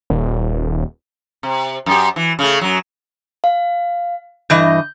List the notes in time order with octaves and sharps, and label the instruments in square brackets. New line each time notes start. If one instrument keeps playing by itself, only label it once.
[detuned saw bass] D#1
[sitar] C3
F#2 G4
E3
C#3 A3
F#2 F#3
[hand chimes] F5
[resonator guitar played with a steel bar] G2 E3 D#5 [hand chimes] G6